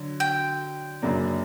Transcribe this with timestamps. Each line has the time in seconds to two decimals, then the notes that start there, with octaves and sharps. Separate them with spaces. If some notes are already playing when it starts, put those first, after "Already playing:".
Already playing: D3 F#3
0.20 G5
1.02 F#2 C#3 F#3 A#3 D4